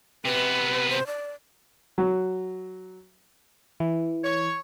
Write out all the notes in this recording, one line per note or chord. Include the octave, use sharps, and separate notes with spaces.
C3 B3 B4
C5
D5
F#3
E3
C#5